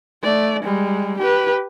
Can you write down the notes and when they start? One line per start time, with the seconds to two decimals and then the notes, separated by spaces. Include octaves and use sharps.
0.23 A3 D5
0.63 G3 G#3
1.19 G4 B4